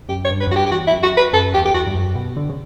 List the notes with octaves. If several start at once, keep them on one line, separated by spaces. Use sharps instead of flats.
F#2 G4
C#5
G2
B4
F#2
G2 F#4 G4
G4
E2 F#4
E4
F#2
F#4
B4
F#2 A4
E2 G4
G4
E2 F#4
G2
F#2
B2
D3
C#3